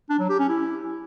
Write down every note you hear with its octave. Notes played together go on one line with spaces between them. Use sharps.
D4
F#3
G4
C#4
E4